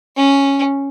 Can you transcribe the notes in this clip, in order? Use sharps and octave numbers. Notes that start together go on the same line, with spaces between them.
C#4